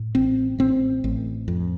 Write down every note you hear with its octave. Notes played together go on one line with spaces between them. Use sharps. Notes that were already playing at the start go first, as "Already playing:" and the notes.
Already playing: A2
A1 C4
A1 C4
A1
F2